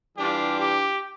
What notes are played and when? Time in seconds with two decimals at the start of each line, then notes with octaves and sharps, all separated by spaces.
0.16 E3 G3 D4 F4 G4
0.59 G4